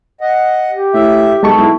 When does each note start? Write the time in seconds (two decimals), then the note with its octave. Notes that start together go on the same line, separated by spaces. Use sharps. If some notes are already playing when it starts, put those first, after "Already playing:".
0.21 D#5 F#5
0.70 G4
0.94 A2 E5
1.43 B1 G#3 B3 A4 A5 C#6
1.58 B1 E4